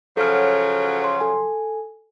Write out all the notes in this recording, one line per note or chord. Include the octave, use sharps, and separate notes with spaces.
C#3 F3 F#3 A4 F6
C6
A4 G#5